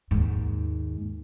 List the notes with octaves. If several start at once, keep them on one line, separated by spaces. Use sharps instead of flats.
D#2 G#2